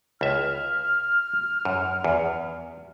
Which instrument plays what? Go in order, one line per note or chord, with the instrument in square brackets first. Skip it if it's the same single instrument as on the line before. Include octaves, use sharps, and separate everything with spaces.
[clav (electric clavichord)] C#2 E5 [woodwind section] F6
[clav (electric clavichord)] F#2
E2